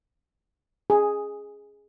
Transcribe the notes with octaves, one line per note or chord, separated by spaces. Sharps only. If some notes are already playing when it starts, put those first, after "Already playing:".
G#4